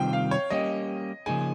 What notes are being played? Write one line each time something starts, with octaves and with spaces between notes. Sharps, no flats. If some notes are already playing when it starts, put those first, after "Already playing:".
Already playing: C3 D#3 G3 C4 F4 G5
F5
C#5
G3 A#3 C#4 G4 D#5
C#3 F3 A#3 D#4 G#4 G#5